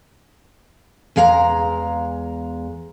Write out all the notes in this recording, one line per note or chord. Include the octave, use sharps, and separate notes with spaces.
E2 G#3 F5 F#5 A#5